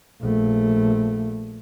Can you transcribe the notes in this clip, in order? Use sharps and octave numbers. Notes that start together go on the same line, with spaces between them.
A#1 A3